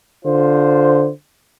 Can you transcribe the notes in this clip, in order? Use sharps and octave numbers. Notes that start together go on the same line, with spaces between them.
D3 F4 C5